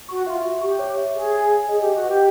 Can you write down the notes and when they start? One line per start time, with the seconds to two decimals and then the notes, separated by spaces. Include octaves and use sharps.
0.09 F#4 C#6
0.27 F4 E5
0.44 F#4 E5
0.62 G4 C#6
0.79 C#5
0.98 E5
1.15 G#4 E5
1.33 C#5
1.51 G#5
1.68 G#4 D#5
1.81 G4 D#5
1.94 F#4
2.04 G4 B4